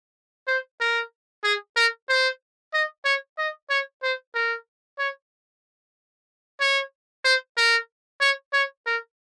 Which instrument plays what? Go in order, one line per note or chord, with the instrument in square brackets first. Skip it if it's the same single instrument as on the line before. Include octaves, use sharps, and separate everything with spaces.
[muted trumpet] C5
A#4
G#4
A#4
C5
D#5
C#5
D#5
C#5
C5
A#4
C#5
C#5
C5
A#4
C#5
C#5
A#4